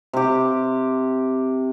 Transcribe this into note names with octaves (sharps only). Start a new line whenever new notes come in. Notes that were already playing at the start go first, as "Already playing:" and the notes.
C3 G4